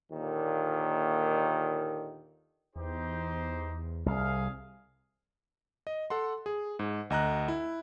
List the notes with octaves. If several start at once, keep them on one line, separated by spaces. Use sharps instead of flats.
D#2 A#2 D3 D#3
E2 D#4 G4 C5
C2 G#4 F5
D#5
A4 F#5 C6
G#4
G#2
D2 D#5 A#5 F#6
E4